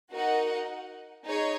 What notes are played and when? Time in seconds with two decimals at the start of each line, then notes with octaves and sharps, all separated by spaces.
0.12 D#4 F#4 A#4 D#5 F#5
1.27 D#4 G#4 C#5